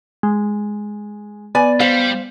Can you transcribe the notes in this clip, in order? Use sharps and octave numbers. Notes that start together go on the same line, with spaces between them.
G#3
B3 D5 G#5
G3 C5 F5